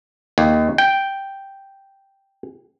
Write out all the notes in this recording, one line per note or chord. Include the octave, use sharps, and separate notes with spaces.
D#2
G5